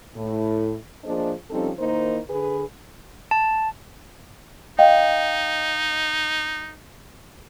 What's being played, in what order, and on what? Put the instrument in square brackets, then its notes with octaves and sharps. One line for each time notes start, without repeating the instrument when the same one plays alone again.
[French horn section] A2
F3 A#3 D4 G#4 C5 D#5
F3 G3 C4 C#4 D#4 A4
D#3 A#3 D#4 E4 C5
D3 G#4 B4
[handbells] A5
[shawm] D#4 [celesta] D#5 F5 G5